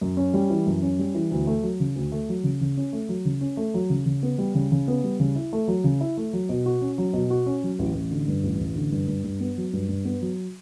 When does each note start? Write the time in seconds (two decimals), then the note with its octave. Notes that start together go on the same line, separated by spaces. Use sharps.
0.01 F#2
0.17 C#4
0.34 G3
0.50 E3
0.66 F#2
0.82 C#4
0.99 G3
1.15 E3
1.31 D2
1.47 A3
1.63 F#3
1.80 C#3
1.96 D2
2.12 A3
2.29 F#3
2.44 C#3
2.61 C#3
2.77 C#4
2.93 A3
3.09 F#3
3.25 C#3
3.41 C#4
3.57 A3
3.74 F#3
3.90 C#3
4.06 C#3
4.23 B3
4.38 G3
4.55 C#3
4.72 C#3
4.88 B3
5.04 G3
5.20 C#3
5.36 E4
5.53 A3
5.68 F#3
5.84 C#3
6.01 E4
6.17 A3
6.33 F#3
6.49 B2
6.66 F#4
6.82 C#4
6.98 F#3
7.13 B2
7.30 F#4
7.46 C#4
7.63 F#3
7.79 A1
7.94 A1
8.11 D3
8.28 G2
8.43 A1
8.60 A1
8.75 D3
8.92 G2
9.08 G2
9.24 G2
9.40 B3
9.57 F#3
9.73 G2
9.89 G2
10.05 B3
10.22 F#3